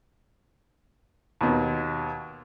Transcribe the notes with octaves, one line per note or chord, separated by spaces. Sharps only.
D#2 B2